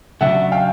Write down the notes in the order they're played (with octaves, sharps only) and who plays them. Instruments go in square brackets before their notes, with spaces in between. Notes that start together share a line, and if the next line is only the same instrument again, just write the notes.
[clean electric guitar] C#3 F#3 A3 D4 [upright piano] E5 F#5
[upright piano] F5 G5